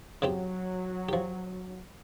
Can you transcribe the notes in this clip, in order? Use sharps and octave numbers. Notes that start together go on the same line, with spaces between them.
C#3 F#3 C4 G4
F3 G4